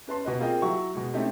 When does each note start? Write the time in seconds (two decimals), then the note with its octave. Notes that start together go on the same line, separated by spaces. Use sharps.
0.07 C#4 B4 A5 C6
0.25 B2 B4 D#5
0.39 A#3 C4 F4 G#4 D#5 G5
0.62 F#3 E4 F#4 C#6
0.95 B2 G#3
1.13 A3 C4 C#4 D#4 E4 G4